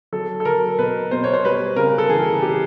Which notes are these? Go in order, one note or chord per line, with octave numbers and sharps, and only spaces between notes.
F#3 A4
A4
F#3 A#4
B2 B4
B2 C5
C#5
C5
G3 B4
C#3 A#4
A4
E3 G#4
G4